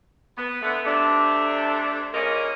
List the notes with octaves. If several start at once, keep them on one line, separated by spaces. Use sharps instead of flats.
B3
D3 A3 B3
C3 A3 D4
A#2 C#3 C#4 A#4 D#5